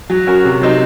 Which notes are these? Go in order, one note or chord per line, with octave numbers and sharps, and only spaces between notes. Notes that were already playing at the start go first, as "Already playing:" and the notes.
F#3
C#4 F#4 A#4
C3
F#3 C4 D#4